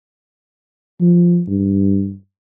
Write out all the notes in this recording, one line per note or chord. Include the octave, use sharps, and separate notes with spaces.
F3
G2